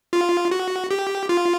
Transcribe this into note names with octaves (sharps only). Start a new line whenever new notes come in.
F4
F#4
G4
F4